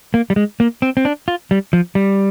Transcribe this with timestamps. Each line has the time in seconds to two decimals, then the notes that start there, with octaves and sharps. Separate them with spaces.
0.14 A#3
0.30 G3
0.36 G#3
0.60 A#3
0.82 C4
0.97 C4
1.05 D4
1.28 F4
1.51 G3
1.73 F3
1.95 G3